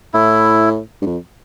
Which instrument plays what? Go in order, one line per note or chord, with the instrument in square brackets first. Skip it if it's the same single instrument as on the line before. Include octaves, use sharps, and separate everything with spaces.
[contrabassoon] A2 [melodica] E4
[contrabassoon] G2
F2